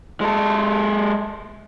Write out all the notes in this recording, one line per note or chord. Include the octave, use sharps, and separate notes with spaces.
G#3 A4